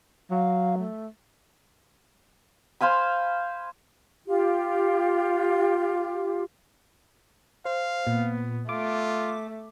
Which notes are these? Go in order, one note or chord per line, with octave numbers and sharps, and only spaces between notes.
F#3 F5
A3
C5 F5 G#5 B5
F4 G4
C5 F5
A#2 B3
A3 F4 D6